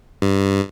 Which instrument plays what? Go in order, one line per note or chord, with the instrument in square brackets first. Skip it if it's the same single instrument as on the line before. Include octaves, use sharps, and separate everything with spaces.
[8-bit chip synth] G2